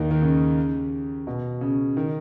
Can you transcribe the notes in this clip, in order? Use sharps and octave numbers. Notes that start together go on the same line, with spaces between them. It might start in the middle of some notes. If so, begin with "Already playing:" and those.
Already playing: D#2 D#3
D#3
C#3
B2
C#3
D#3